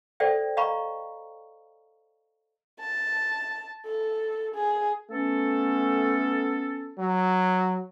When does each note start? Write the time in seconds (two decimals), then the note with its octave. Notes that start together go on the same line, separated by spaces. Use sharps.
0.20 A4 C5 D5 E5 G5
0.57 D#5 F5 A#5 B5 C#6
2.80 A5
3.86 A4
4.55 G#4
5.10 A3 B3 C#4 A4
6.98 F#3